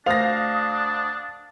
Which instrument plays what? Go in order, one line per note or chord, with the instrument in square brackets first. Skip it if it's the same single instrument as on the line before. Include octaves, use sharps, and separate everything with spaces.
[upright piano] D2 C5 F7 [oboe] D4 [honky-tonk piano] F5 A#6 [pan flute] D#6